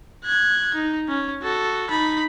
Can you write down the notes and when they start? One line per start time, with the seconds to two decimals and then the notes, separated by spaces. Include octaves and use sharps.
0.25 F#6 G#6
0.75 D#4
1.08 C#4
1.43 F#4 A4
1.90 D#4 B5